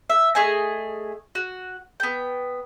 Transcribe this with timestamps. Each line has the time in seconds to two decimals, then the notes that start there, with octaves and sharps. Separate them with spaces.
0.10 E5
0.35 A3 G#4 D#5 G#5
1.35 F#4
2.00 B3 G5